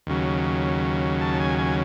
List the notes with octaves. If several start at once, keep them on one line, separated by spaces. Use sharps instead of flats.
D#2 C#3 F#3
A5
G#5
G#5